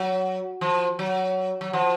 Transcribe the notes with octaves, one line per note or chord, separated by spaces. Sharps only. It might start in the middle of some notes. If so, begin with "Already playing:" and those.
Already playing: F#3
F3
F#3
F#3
F3